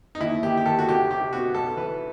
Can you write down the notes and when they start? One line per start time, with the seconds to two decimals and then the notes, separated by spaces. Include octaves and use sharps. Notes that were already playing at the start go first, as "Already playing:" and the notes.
0.15 D#4
0.20 D#2 E4
0.43 D#2 G4
0.57 G4
0.66 D#3 A4
0.79 F#4
0.88 C2 G4
1.10 C2 G4
1.33 B2 F#4
1.54 B1 A4
1.77 E3 B4